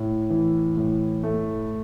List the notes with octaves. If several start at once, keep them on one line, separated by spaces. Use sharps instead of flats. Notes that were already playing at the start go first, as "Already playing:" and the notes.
Already playing: A2
E3
A2
A3